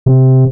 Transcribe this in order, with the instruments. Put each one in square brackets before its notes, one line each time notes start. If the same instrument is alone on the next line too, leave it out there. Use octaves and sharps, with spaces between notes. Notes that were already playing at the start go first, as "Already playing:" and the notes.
[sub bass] C3